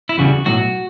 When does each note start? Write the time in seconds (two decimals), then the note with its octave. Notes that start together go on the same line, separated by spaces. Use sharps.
0.09 E4
0.18 E2 C#3 E3 G3 F#4
0.46 B1 A2 F#3 F#4